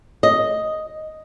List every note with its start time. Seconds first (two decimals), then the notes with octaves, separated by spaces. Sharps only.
0.23 D#5